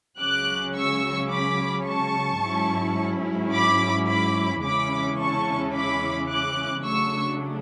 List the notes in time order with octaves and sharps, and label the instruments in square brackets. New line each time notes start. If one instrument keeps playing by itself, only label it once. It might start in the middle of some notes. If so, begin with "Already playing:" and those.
[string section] C#2 C#3 F#3 C#4 D6 F#6
C#6 E6
B5 D6
A5 C#6
G#2 F#3 C#4 E4
B5 D6
B5 D6
E2 C#3 G#3 C#4 E4 B5 D6
A5 C#6
B5 D6
D6 F#6
C#3 F#3 A3 D4 C#6 E6